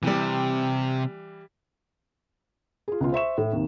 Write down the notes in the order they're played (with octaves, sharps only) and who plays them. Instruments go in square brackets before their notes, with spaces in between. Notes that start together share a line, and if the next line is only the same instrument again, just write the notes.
[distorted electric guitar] C3 [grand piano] E3 G3
[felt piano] F4 G#4
C#2 B2 F4
C5 E5 C#6 E7
A2
D#2 C3